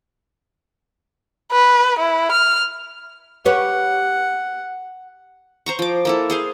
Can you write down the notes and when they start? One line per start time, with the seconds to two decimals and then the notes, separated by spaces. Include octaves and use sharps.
1.52 B4
1.99 E4
2.32 F6
3.46 G4 B4 C#5 F#5
5.66 C5 A#5 C#6
5.79 F3 D6
6.05 A#3 E4 A4
6.30 G#4 C5 F5